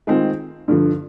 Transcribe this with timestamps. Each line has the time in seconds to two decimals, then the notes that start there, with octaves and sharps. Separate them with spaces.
0.07 D#3 G#3 C4 F4
0.68 G2 D3 F3